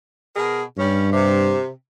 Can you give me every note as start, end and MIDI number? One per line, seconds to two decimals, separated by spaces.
0.36 0.62 47
0.36 0.62 68
0.36 0.62 70
0.78 1.56 43
0.78 1.07 55
0.78 1.07 61
1.13 1.69 48